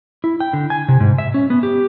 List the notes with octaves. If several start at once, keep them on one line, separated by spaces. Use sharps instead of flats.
E4
G5
D3
G#5
C3
G#2
E5
C#4
B3
G4